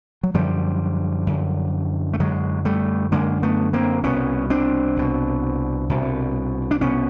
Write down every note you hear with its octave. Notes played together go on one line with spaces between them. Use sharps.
F#3
F#2 D3 F3 G3
F#2 D3
A3
F#2 D3 F#3 G#3
G3 A3
F#2 D3 G#3 A#3
A3 B3
A#3 C4
C2 B2 B3 C#4
C4 D4
C2 B2
C2 B2
D4
C2 B2 B3 C#4